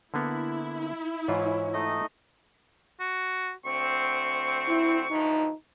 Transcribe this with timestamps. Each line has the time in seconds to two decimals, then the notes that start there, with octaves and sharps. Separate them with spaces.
0.14 D3 A#3 B3 E4
1.28 G#2 E3 F4 C#5
1.74 A3 D#4 D#5
3.00 F#4
3.65 D2 C4 C#6
4.68 E4
5.10 D2 E3 F3 D#4